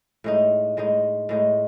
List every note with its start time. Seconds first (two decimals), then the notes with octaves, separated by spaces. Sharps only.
0.24 A2 G#3 D#4
0.77 A2 G#3 D#4
1.29 A2 G#3 D#4